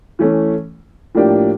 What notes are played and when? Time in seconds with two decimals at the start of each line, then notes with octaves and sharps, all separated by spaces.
0.19 E3 A3 C#4
1.15 A2 F3 A#3 D4 G4